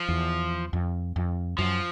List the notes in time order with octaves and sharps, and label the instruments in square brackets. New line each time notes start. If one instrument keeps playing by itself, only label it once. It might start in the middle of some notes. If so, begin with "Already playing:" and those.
Already playing: [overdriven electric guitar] F3
[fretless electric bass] E2
F2
F2
[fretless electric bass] F#2 [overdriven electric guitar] F3